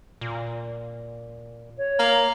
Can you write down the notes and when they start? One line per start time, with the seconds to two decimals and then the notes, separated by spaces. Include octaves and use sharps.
0.21 A#2
1.78 C#5
1.99 A#3